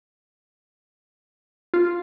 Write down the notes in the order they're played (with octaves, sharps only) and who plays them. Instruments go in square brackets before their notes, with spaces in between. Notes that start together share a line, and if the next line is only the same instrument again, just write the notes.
[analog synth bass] F4